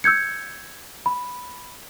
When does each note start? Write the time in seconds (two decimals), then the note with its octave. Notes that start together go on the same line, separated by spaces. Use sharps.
0.04 E6 G6 G#6 C#7
1.06 B5